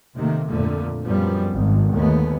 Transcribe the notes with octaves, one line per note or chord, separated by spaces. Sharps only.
C3 D#3 A3 A#3
F2 A#2 D3 A3
F#2 F3 G3 B3
G#1
D#2 D3 G#3 A3 B3